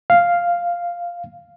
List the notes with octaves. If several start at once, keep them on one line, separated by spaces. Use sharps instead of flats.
F5